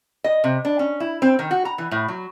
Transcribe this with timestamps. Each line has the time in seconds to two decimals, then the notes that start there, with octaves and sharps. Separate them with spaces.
0.24 D#5
0.44 C3
0.65 D4
0.79 C#4
1.00 E4
1.22 C4
1.39 D#3
1.51 F#4
1.65 A#5
1.78 E3
1.91 A2
2.08 F#3